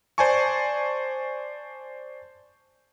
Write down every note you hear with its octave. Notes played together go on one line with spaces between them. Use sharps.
C5 D5 G#5 A5 C#6